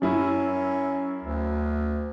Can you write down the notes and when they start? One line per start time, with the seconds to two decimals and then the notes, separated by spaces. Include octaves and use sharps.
0.02 F#2 C#4 E4
1.23 D2